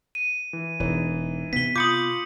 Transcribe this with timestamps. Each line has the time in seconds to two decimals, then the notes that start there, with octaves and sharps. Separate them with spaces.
0.15 D#7
0.53 E3
0.80 E1 E3 D#4
1.53 C3 B3 B6 G7
1.76 F4 B5 C6 D6 D#6 G6 C#7 F#7